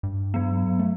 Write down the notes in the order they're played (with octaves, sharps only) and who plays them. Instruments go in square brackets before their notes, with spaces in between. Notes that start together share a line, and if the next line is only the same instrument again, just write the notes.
[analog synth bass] G2
[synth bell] F#3 B3
[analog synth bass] A3